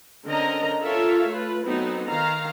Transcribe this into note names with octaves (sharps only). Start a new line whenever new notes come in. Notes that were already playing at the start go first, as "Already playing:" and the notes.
D3 C4 C#4 A#4 D#5 A#5
F4 A4 A#4 C#5 E5 F5
A3 F4 B4
F#3 A3 B3 C4 D#4
D#3 F5 A#5